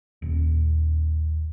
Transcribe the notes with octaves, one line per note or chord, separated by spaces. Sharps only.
D#1